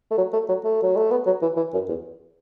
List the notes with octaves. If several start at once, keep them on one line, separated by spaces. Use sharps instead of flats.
A3
F#3
A3
F#3
A3
F#3
A3
B3
F#3
E3
E3
F#2
E2